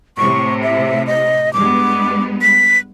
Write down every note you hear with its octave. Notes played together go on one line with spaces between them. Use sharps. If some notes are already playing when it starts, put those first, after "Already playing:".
A2 C3 C#6
E5
D#5
G2 G#3 B3 D6
B6